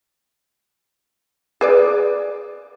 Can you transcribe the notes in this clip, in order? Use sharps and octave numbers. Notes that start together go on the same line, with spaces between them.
G#4 B4 D5